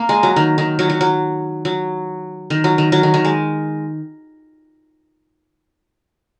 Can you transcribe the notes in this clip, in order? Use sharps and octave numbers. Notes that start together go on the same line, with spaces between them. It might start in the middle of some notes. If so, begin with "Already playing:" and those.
Already playing: A#3
G#3
F#3
D#3
D#3
F#3
F#3
F#3
F#3
D#3
F#3
D#3
F#3
D#3
D#3
G#3